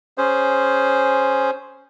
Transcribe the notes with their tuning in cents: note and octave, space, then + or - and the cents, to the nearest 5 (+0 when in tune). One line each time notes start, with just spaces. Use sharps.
C#4 +0 G#4 +0 C5 +0